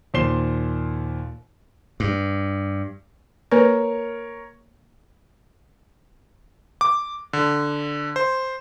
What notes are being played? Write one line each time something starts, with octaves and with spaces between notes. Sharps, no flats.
D#2 A#2 C5 C7 E7 G7
G2
A#3 A#4 B4 C#5
D6
D3
C5